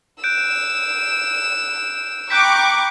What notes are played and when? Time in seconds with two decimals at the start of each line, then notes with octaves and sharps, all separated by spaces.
0.24 E6 F#6 G6 D7 E7
2.30 G5 A#5 B5 C#6 D6 F#6 G6 B6